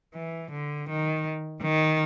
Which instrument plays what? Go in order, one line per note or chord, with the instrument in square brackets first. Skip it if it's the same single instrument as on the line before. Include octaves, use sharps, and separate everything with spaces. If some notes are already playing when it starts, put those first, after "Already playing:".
[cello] E3
D3
D#3
D#3